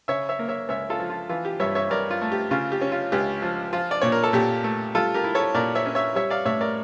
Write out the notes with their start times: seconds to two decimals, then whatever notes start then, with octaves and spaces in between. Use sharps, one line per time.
0.08 C#3 C#5 E5
0.29 C#5 E5
0.39 A#3
0.48 C#5 E5
0.69 C#2 C#5 E5
0.90 F4 A4
1.00 F3
1.10 F4
1.29 E3 F4
1.45 G4
1.60 G2 C#5 E5
1.75 C#5 E5
1.90 G2 A#4 D5
2.10 F4
2.21 A3
2.32 G4
2.51 C#3 F4
2.72 G4
2.81 C#4
2.92 F4
3.12 C#2 G4
3.42 F3
3.73 F3 F4
3.91 D5
4.02 A#2 C#5
4.12 A#4
4.24 A4
4.33 A#2 G4
4.64 A3
4.95 G3 F4 A4
5.14 G4 A#4
5.24 E4
5.35 A4 C#5
5.54 A#2 A#4 D5
5.75 C#5 E5
5.86 C#4
5.95 C#5 E5
6.15 G3 C#5 E5
6.30 D5 F5
6.45 A2 C#5 E5
6.61 A#4 D5